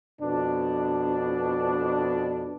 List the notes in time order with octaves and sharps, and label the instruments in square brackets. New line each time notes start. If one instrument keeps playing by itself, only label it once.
[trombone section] F2 B2 D4